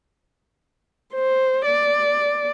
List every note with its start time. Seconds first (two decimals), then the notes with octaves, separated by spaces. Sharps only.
1.14 C5
1.66 D5